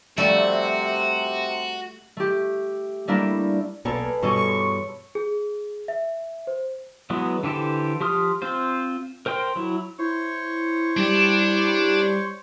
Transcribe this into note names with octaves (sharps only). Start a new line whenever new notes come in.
C3 F3 G3 A3 F#4
A3 G4
G3 A3 A#3 D4 E4
B1 B2 A#3 G#4 A4 B4 C#5 D5
G2 B2 E3 G3 A4 C#5 G#5 C#6
G#4
E5
C5
E3 F#3 G#3 B3
D3 E3 G4 A4 C5
F3 G4 C6 D#6 F6
C4 F4 C5
A#4 C5 G5 C6
F#3 E4
E4 C5 C#5 C#6
G3 D4